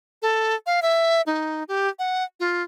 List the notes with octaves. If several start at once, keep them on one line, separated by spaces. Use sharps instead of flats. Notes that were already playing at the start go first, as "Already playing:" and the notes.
A4
F5
E5
D#4
G4
F#5
F4